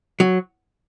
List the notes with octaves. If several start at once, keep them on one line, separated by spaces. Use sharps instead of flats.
F#3